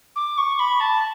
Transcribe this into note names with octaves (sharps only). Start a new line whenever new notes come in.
D6
C#6
B5
A5